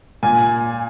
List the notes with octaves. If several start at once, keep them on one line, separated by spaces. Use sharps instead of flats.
A#2 G#5